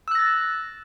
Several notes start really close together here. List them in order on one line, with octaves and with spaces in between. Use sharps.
E6 F#6 A#6 A6